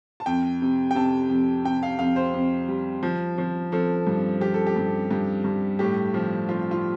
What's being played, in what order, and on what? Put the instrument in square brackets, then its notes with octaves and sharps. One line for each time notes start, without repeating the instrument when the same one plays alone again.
[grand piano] A5
F2 G5
C3
G5
C3 A5
F2
C3 G5
F5
F2 F5
C5
F2
G3
F3
F3
F3 A4
G2
F3 G4
A4
G4
G2
G2
G2
A2 G4
F3
F3 F4
F4